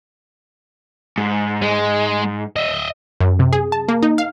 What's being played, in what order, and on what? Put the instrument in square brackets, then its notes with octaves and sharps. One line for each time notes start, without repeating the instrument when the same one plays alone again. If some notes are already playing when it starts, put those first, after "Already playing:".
[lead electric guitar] G#2
[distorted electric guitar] G#3
D#5 E5
[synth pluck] F#2
C3
G#4
A5
A#3
D#4
F5